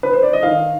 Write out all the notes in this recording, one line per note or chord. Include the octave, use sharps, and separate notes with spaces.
B4
C5
D5
D#5
D#3 F5